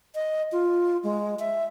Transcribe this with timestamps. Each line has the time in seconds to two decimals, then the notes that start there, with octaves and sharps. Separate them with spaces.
0.15 D#5
0.52 F4
1.03 G#3
1.39 E5